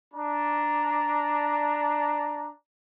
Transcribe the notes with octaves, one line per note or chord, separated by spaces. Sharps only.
D4 A#5